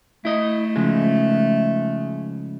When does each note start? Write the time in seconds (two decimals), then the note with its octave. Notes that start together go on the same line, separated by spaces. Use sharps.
0.25 A3 E4 D#5
0.76 C#3 F3 G#3